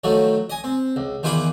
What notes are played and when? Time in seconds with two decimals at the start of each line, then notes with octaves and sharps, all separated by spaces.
0.04 D#3 F3 F#3 A3
0.50 D#5 G#5
0.64 C4
0.96 C#2
1.23 E2 D#3 F4 G#4 B5 D6